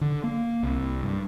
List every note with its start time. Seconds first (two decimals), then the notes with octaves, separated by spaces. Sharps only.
0.01 D3
0.24 A#3
0.63 C2
1.03 G2